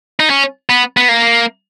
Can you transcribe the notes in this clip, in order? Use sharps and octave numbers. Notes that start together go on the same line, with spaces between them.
D#4
C#4
B3
B3
A#3